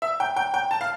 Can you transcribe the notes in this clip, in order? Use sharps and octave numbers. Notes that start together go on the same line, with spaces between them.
E5
G5
G5
G5
A5
F5